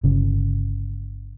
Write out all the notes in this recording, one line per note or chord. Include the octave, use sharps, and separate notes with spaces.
G1 C#3